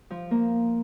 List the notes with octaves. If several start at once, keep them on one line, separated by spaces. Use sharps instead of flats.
F3
A#3